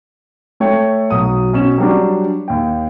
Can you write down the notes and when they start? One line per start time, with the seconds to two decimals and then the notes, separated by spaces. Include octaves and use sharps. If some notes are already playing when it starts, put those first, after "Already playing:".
0.60 A3 A4 C#5 G5
1.10 B1 F#3 D#6
1.53 B2 C#4 E7
1.78 F#3 G3 D4
2.48 D#2 G5